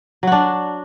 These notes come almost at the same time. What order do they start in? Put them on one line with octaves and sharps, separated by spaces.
F#3 F#4 D4